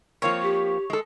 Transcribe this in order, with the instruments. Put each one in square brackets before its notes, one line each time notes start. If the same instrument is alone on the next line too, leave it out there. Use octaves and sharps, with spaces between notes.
[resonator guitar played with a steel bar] F3 A#3 C4 [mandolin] C#5
[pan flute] G4
[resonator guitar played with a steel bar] G#3 A4